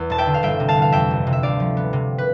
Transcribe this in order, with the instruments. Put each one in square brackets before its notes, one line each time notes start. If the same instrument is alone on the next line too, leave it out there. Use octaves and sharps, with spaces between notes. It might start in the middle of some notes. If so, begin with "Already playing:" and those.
Already playing: [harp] E2
E1 A5
E5 G5
D3
F5
G1 E5 G5
C3
F5 A5
E3
F5
F2 E5 G5
G1
C3
E5
D2 D5 F5
F3
B3
C3
B4